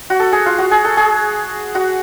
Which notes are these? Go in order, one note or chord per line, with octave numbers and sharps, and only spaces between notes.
F#4
A4
G#4
F4
F#4
G#4
A4
G#4
F#4